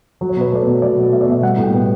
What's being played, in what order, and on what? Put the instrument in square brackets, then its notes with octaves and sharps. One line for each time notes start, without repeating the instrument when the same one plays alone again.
[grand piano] F#3
C#5
B2 B4
A3 D5
C#5
B2
F#3 D5
B2
A3 E5
D5
B2 E5
G3 F#5
A2
G5
B3